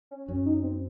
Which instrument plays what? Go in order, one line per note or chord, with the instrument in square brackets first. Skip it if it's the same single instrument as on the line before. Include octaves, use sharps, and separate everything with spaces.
[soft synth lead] C#4
[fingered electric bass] F#2 [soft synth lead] C#4
[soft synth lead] D#4
C4